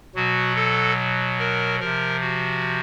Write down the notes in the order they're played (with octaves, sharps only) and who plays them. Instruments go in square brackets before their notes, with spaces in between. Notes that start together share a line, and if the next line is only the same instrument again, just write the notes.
[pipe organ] B2 F#3 F#4
A4
A#4
C3 F3 A#4
F#4